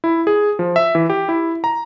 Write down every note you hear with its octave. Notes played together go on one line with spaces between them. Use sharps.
E4
G#4
F3
E5
E3
G4
E4
A#5